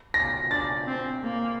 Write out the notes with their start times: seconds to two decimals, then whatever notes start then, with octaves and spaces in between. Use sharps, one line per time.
0.14 A#6
0.51 D4 A6
0.87 C4
1.23 A#3